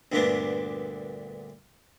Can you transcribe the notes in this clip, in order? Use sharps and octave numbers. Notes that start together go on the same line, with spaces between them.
D2 G2 A#2 B3 D4